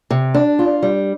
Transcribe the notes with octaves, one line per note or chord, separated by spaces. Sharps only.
C3
D4
F4
G3